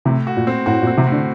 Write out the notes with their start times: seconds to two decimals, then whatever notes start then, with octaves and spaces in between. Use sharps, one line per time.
0.05 A2 C3
0.27 F#4
0.37 A#2
0.47 C4
0.66 A2 F#4
0.82 A#2
0.87 C4
0.97 C3
1.06 A2
1.12 D3